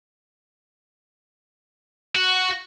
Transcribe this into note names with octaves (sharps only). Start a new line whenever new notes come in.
F#4